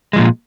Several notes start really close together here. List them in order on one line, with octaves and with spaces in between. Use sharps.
G#3 F3 A#2